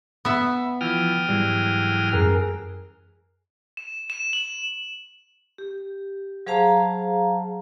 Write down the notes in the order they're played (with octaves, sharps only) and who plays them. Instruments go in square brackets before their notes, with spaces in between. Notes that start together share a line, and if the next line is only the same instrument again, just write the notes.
[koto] B3 E5 [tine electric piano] B5
[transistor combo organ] E3 F3 [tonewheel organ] G5 D#6 F6
[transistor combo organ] G#2 E3 F#3 [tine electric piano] G3
[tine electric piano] F#2 F#6 [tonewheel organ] G#4 A#4
[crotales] E7
E7
F#7
[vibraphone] G4
F#3 G#4 C5 F5 A5 A#5